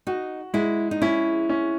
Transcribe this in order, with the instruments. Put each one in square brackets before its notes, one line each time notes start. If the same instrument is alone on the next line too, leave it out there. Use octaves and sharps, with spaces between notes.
[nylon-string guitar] D#4 [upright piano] F#4
[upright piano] G#3 [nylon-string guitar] E4
[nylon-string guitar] D#4
[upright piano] C#4 [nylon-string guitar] E4
[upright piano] C#4